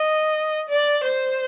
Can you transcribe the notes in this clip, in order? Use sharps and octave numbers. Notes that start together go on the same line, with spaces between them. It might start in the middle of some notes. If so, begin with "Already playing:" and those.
Already playing: D#5
D5
C5